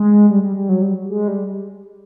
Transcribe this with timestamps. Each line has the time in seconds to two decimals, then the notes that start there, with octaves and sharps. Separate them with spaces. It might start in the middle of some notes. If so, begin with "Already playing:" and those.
Already playing: G#3
0.30 G3
0.43 G3
0.56 G3
0.69 F#3
0.82 G3
1.09 G#3
1.28 G3